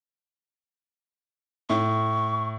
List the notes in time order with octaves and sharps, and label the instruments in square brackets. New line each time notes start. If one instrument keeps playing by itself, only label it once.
[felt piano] A2 [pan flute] C#6